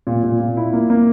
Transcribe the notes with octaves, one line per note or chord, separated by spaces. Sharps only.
A#2
A#2
A#2
E4
A#3
A#3